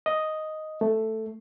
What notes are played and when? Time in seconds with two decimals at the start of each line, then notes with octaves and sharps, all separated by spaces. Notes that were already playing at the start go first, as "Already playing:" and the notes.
0.06 D#5
0.81 A3